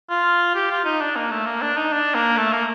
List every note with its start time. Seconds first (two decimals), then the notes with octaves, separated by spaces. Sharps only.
0.09 F4
0.55 G4
0.70 F4
0.85 D#4
1.01 D4
1.16 A#3
1.30 A3
1.46 A#3
1.61 D4
1.77 D#4
1.92 D4
2.14 A#3
2.37 A3
2.53 A#3